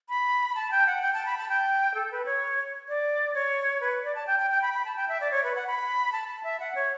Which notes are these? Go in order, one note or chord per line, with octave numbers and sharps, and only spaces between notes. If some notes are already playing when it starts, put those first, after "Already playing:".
B5
A5
G5
F#5
G5
A5
B5
A5
G5
A4
B4
C#5
D5
C#5
B4
D5
A5
G5
G5
G5
B5
B5
A5
G5
E5
D5
C#5
B4
F#5
B5
A5
A5
E5
F#5
C#5